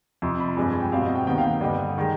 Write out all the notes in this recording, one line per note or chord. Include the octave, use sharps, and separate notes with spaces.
F2 C3 F3 C6
B5
G2 F3 G#3 C4 G#5
G#5
G5
B2 G3 C4 F5
D#5
G5
D#2 D#3 B3 G5
F5
G2 D3 G3 D#5
D#3 G#3